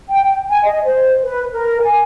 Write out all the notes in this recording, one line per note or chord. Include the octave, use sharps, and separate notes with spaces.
G5
G#5
D#5
C5
B4
A#4
G#5